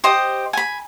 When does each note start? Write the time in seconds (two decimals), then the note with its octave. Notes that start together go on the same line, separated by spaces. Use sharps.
0.04 G4 C5 D#5 D#6
0.53 G#5 B5